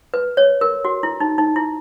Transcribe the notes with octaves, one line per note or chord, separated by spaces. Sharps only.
B4
C#5
A#4
F#4
E4
D#4
D#4
E4